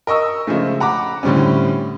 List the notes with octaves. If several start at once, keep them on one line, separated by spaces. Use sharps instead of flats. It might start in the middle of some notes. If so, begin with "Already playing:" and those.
A#4 D#5 C#6 E6
C#3 F3 G#3 A3
F#5 A#5 B5 D6
A2 D3 G3 C4 C#4